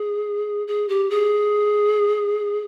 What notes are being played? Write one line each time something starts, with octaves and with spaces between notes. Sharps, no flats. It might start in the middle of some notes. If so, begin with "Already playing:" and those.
Already playing: G#4
G#4
G4
G#4